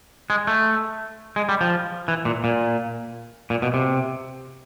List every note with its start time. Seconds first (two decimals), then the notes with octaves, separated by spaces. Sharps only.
0.30 G#3
0.47 A3
1.36 G#3
1.49 G3
1.61 F3
2.08 E3
2.25 A#2
2.44 A#2
3.50 A#2
3.62 B2
3.74 C3